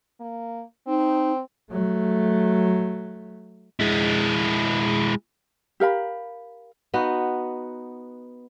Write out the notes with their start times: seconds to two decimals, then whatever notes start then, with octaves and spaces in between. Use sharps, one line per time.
0.20 A#3
0.87 C4 D#4
1.71 F#3 A3
3.80 G#3 E4
5.80 G4 A#4 F5 B5
6.94 B3 D#4 F#4